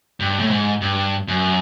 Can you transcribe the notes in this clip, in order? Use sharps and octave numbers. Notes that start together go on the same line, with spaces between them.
G2
A2
G#2
G2
F#2